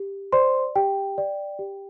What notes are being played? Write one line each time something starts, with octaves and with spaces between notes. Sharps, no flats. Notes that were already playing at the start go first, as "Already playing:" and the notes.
Already playing: G4
C5 D5 C6
G4 G5
D5
G4